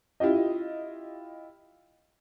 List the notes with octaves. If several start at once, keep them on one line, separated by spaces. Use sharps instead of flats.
E4 F4 G4 D#5